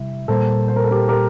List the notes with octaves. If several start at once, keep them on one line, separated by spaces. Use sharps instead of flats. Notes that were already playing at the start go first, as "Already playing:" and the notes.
Already playing: C3 G3 E4
A#2 G3 A#3 A4 C5
C5
A#4
A4
G4 A#4
G4 A#4